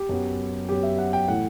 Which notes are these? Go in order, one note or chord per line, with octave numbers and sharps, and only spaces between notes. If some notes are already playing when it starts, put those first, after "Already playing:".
Already playing: G4
F#2 F#3 B3
F#2 F#3 B3 G4
E5
F#5
G5
A2 E3 A3 F#5